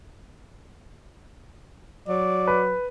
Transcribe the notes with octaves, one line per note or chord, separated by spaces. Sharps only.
F#3 D5
B4